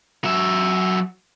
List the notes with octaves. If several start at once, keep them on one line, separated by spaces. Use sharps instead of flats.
F#3 E5